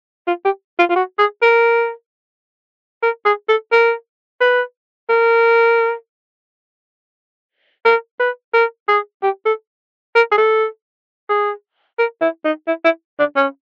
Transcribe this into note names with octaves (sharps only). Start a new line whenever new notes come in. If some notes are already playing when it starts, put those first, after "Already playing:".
F4
G4
F4
F4
F#4
G#4
A#4
A#4
G#4
A4
A#4
B4
A#4
A#4
B4
A#4
G#4
G4
A4
A#4
G#4
A4
G#4
A#4
E4
D#4
E4
E4
D4
C#4